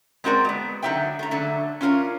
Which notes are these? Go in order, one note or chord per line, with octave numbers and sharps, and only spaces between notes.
G#3 C4 F#4 A#4 D5
G#3 B3
D3 F#3 D#4 G4 E5 G5
A3 A#5
D3 F#3 A3
C#4 D4 F4 G#4 A#4 C#5